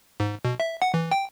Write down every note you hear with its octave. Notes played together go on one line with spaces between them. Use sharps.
G#2
B2
E5
F#5
E3
G5